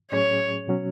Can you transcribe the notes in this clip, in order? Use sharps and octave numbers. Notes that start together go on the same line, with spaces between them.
A2 F#3 C#4 G#4 C#5
B2 F#3 C#4 F#4